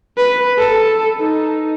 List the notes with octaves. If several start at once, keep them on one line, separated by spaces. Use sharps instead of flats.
B4
A4
D#4